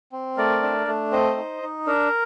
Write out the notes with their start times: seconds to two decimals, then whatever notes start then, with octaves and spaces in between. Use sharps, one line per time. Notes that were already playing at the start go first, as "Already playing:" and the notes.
0.12 C4
0.37 A3 A#4 D5
0.63 D4
0.87 A3
1.12 C4 C5 D#5
1.37 D#4
1.62 D#4
1.87 D4 A#4